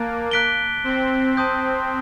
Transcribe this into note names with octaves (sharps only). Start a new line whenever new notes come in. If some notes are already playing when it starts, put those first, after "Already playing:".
Already playing: A#3 A5 D6 F#6 A6 D7
F#6 B6 D7 G7
C4
A5 C6 D#6 G6